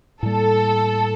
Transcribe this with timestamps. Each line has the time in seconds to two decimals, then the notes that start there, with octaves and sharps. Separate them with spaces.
0.23 A2 G3 A#3 A4